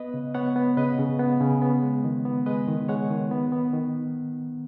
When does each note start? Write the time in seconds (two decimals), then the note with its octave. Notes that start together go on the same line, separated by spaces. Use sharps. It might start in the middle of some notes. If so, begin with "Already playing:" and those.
Already playing: B3 B4 D#5
0.14 C#3
0.34 B3 C#5 F#5
0.56 B3
0.77 C#3 B4 D#5
0.98 C#3
1.19 B3
1.40 C#3
1.62 B3
1.83 G#3
2.04 D#3
2.25 B3
2.46 G#3 B4 D#5
2.68 D#3
2.89 G#3 C#5 F#5
3.10 D#3
3.31 B3
3.52 B3
3.73 D#3